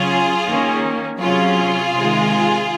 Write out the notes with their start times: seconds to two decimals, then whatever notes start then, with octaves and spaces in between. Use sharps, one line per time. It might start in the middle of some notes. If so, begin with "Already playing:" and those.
Already playing: C#3 F#3 C#4 F4 G#4
0.48 D#3 A#3 C#4
1.20 C3 F#3 C#4 F4 G#4
1.93 C3 D#3 G#3